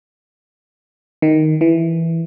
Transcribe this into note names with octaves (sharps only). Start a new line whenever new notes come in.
D#3
E3